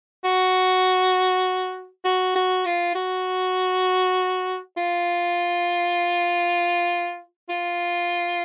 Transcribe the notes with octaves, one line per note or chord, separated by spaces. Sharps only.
F#4
F#4
F#4
F4
F#4
F4
F4